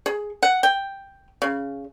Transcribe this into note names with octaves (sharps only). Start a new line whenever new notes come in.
G#4
F#5
G5
C#3